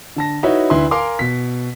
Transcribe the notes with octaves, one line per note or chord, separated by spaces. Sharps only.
D3 A5 A#6
D#4 E4 F#4 B4 C#5 E5
D2 D3 E4 B4 C6
A#4 F5 G#5 A#5 C6 D6
B2 B6